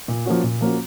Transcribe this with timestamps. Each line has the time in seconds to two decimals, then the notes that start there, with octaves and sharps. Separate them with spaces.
0.08 A#2
0.26 F3 A#3 C#4 F#4
0.44 A#2
0.61 F3 A#3 C#4 F#4